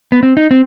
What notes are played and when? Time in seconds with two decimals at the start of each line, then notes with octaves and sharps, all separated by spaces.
0.12 B3
0.23 C4
0.37 D#4
0.51 C4